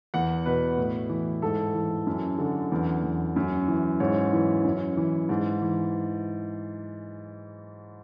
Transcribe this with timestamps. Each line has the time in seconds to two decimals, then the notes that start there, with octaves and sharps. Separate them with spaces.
0.14 E2 F#5
0.46 B2 B4
0.78 A2
1.09 E3
1.42 G#2 A4
1.74 E3
2.07 F#2
2.38 D3
2.72 E2
3.03 E2
3.36 F#2
3.68 E3
4.00 G#2 C#5
4.33 E3
4.64 F#2
4.97 E3
5.29 G#2
5.62 E3